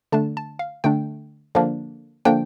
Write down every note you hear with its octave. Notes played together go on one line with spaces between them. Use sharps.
D3 A3 D4 A5
A5
F5
D3 A3 D4 G5
D3 F3 A#3 D4
D3 F3 A#3 D4 G5